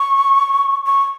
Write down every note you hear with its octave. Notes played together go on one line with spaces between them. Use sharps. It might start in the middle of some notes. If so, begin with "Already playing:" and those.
Already playing: C#6
C#6